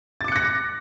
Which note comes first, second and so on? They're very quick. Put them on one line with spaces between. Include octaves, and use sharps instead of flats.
A6 D6 C#7 F#6 A#6